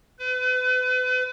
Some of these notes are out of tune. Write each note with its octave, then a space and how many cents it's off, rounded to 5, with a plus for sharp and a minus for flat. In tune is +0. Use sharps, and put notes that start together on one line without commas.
B4 +40